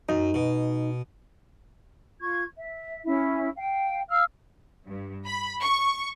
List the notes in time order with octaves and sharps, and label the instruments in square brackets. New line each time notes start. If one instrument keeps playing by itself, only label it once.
[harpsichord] F#2 [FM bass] D#4
[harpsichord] B2
[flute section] F4 C#6 G#6
E5
C#4 E4 E5
F5 G5
F5 E6 F6
[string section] G2
B5
C#6